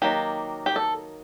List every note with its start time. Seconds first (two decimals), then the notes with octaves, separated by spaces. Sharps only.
0.02 D#3 F#3 A#3 G4
0.66 G4
0.76 A4